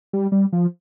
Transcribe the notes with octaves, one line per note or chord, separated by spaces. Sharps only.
G3
G3
F3